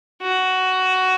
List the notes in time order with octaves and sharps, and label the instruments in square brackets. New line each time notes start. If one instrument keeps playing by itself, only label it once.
[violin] F#4